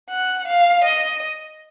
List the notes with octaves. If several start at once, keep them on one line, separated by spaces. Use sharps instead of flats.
F#5
F5
D#5